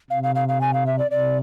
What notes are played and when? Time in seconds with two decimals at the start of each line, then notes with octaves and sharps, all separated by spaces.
0.10 C3 F5
0.23 F5
0.35 F5
0.48 F5
0.61 G#5
0.74 F5
0.87 E5
0.99 D5
1.11 C3 D5